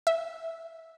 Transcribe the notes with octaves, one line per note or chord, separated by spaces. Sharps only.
E5